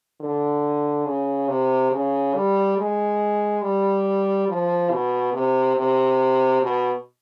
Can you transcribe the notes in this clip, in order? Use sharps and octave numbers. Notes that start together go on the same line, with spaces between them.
D3
C#3
C3
C#3
G3
G#3
G3
F3
B2
C3
C3
B2